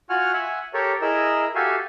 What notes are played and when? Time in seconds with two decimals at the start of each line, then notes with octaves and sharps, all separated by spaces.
0.10 F4 F#4 F#5 G#5 F6
0.34 E5 F#5 G#5
0.74 G4 A4 A#4 C#5
1.02 E4 G#4 A#4 D#5 E6
1.55 F#4 G4 A4 E5 F5 G#5